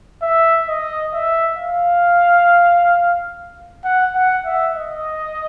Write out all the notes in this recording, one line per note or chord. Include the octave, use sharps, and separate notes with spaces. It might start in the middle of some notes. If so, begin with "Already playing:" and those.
E5
D#5
E5
F5
F#5
F#5
E5
D#5